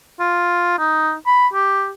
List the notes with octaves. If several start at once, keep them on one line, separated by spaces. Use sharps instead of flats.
F4
D#4
B5
G4